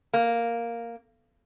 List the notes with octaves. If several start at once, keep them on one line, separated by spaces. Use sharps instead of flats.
A#3